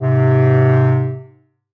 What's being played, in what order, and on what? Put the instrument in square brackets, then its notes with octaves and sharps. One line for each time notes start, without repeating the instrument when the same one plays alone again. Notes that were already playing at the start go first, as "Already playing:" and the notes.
[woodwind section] G#2 C3